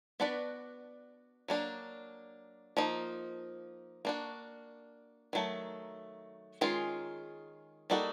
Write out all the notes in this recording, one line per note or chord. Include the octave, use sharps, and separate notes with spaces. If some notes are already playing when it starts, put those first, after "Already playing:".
B3 D4 F#4 B4 D5
F#3 A#3 D4
F3 A#3 D#4
A#3 D4 F#4
D#3 F#3 A3
D#3 G#3 C#4 F4 G#4
G3 A#3 D#4 F#4 A4